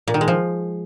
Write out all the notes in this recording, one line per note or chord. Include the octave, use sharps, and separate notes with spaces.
A#2
D#3
G#3
F3